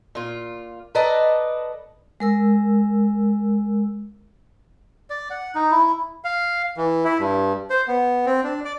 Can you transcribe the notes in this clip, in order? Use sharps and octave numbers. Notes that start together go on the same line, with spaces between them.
A#2 F4
A4 B4 D5 D#5 A5 A#5
G#3 A#4 E6
D5
F#5
D#4
E4
F5
E3
E4
G2
C5
B3
C4
D4
D5